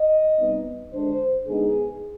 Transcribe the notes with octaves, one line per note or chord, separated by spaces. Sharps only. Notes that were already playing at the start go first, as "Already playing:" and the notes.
Already playing: D#5
C3 G3 B3 D#4
D3 G#3 D4 C5
D3 G#3 B3 D#4 G#4